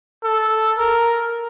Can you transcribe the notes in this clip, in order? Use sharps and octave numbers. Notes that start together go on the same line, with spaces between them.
A4
A#4